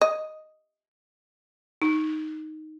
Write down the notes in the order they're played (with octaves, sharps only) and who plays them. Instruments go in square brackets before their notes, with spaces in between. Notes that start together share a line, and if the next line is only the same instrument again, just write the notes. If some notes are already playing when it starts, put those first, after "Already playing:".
[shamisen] D#5
[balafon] D#4